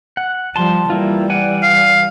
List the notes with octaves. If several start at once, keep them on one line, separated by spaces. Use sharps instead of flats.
F#5
F3 G3 A5 C6
E3 G3 A#3 E4 F4
D5 F#5 G#5
F5